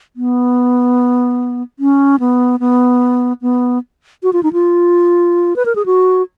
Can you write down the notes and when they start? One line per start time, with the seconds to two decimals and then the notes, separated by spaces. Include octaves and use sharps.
0.16 B3
1.79 C#4
2.20 B3
2.60 B3
3.42 B3
4.23 F#4
4.33 F4
4.43 D#4
4.53 F4
5.56 B4
5.66 A#4
5.76 G#4
5.86 F#4